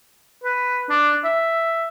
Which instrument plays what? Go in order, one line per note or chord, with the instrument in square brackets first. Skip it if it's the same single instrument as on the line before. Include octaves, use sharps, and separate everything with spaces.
[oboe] B4
D4
E5